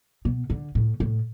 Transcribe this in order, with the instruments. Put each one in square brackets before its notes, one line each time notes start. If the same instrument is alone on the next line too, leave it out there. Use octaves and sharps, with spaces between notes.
[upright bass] B2
D3
A2
A2